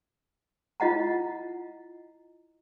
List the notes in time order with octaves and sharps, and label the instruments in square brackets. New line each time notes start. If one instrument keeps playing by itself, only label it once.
[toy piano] E4 F4 D#5 F#5 A#5